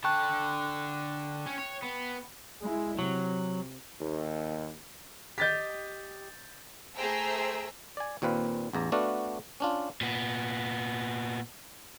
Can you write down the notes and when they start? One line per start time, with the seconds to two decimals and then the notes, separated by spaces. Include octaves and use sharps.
0.04 D3 G5 A5 C#6 F#6
1.46 C#4
1.58 C#5
1.82 B3
2.62 G#3 E4
2.99 C3 F#3
4.01 D#2
5.38 G4 D#5 G6 A6 B6
6.95 A3 G#4 C5 G5 A#5 E6
7.97 D5 G#5
8.22 D#2 A#2 C4 B4 F5
8.73 A1 E2 A#5
8.92 A3 B3 D4 F#4 D5 F5
9.60 C#4 D4 F4
10.01 A#2 B3